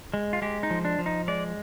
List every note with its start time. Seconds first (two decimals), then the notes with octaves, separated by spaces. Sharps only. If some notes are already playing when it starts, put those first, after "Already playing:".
0.14 G#3
0.33 F4
0.42 G#3 G4
0.63 D#4
0.70 F3
0.85 D4
0.99 F3
1.06 D#4
1.28 G#3 D5